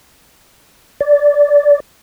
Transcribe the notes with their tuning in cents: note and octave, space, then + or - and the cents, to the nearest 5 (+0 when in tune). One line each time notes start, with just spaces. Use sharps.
D5 -15